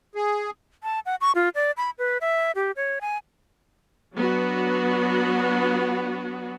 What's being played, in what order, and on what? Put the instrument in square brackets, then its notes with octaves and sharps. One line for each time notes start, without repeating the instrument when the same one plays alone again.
[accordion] G#4
[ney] A5
F#5
C#6
F4
D5
B5
B4
E5
G4
C#5
G#5
[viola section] F#3 B3 D4 F#4